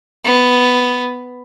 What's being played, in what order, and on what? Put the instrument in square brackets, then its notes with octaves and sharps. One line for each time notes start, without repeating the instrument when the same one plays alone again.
[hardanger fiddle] B3